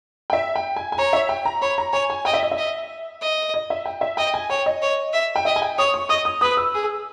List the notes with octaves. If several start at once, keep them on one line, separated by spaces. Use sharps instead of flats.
G5
E5
G5
G#5
G#5
C#5 A#5
E5
G5
A#5
C#5 B5
A#5
C#5 G#5
G#5
D#5 G5
E5
D#5
E5
D#5
D#5
D#5
E5
G5
E5
D#5 G5
G#5
C#5 G5
D#5
C#5
E5
G5
D#5 E5
G#5
G5
C#5 D#6
C#6
D#5 D#6
D#6
B4 D#6
E6
G#4